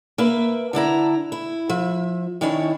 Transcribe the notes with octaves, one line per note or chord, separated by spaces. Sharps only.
A#3 B4 E5
D3 D4 E4 A#5
E4
F3 E5
D#3 C#4 D4 E4 C#5